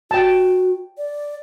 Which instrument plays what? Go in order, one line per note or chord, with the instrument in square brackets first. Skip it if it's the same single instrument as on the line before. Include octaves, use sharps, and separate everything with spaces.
[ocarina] F#4 [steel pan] G5 A5
[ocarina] D5